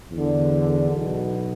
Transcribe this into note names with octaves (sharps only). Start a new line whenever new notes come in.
E2 D3
B1 B2